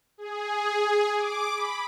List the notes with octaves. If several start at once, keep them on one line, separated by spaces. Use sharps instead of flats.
G#4
D6
B5